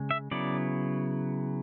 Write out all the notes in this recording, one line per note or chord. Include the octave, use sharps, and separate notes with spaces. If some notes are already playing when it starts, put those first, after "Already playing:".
Already playing: C#3 G#3
E5
C#3 F#3 B3 E4 D5